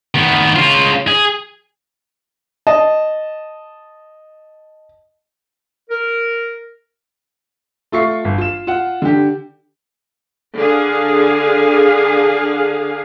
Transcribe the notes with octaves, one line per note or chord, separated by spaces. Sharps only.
D#3 B3
C#3 F4
G#4
D#5 A5
A#4
A3 F4 C#6 C7
G1
F4 E7
F4 F#5
D3 G4
D3 G#4 F5